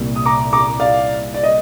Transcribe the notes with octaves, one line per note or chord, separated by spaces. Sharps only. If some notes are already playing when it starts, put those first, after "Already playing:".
Already playing: C2 A#2 G3
D#6
A#5 D6
A#5 D6
D5 F5
D5
D#5